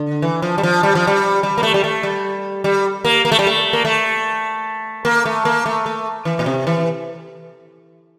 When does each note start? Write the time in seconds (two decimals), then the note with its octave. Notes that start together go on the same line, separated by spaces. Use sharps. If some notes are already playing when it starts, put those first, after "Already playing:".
Already playing: D3
0.22 E3
0.42 F3
0.58 G3
0.63 F3
0.83 G3
0.95 F3
1.07 G3
1.43 G3
1.58 A#3
1.63 A3
1.74 G3
1.84 A3
2.03 G3
2.64 G3
3.05 A#3
3.25 A#3
3.32 A3
3.39 G3
3.47 A3
3.73 A#3
3.85 A3
5.05 A#3
5.25 A3
5.45 A#3
5.66 A3
5.86 A3
6.25 E3
6.39 A#2
6.46 C3
6.67 E3